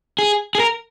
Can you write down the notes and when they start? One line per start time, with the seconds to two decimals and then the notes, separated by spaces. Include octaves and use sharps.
0.19 G#4
0.55 G#4
0.60 A#4